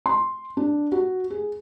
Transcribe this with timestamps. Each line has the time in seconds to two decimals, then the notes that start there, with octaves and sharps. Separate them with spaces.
0.06 C6
0.57 D4
0.92 F#4
1.30 G#4